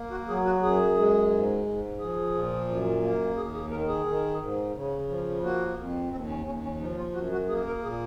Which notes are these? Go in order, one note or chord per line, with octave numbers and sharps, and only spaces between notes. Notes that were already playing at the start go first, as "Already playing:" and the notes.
Already playing: A#3
F#4
F#3 G#4
F#4
F#2 G#4
G#3
G#2
G#2
F3 G#4
A#2
F#2
A#3
D#2 G#4
G#4
D#3 A#4
G#4
D#3
G#2
C#3
F3
A#3 F#4
F2
D#2 C4
C#4
D#2 C#4
C#4
F3 D#4
F4
F#2 F#4
F#4
A#3 G#4
A#4
A#2 G#4